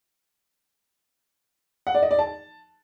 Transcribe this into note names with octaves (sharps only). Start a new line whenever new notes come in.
F#5
D5
D#5
D5
A5